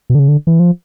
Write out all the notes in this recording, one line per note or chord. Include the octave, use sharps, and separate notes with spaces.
B2
D3
C#3
D3
E3
F3